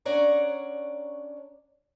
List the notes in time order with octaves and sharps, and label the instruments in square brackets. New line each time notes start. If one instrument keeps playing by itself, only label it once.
[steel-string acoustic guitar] C#4 D4 C#5 D5 F#5 A#5